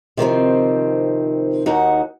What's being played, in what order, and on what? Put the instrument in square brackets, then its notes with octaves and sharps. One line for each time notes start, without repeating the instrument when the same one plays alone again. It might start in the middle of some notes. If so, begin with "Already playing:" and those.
[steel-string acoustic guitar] C3 D#3 F3 C4
D#2 D#4 F#4 F#5